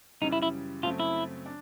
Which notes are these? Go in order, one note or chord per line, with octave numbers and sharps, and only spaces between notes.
F#2 C#3 E3 G3 D#4
E4
E4
F#2 C#3 F#3 A3 C4 F4
E4
D4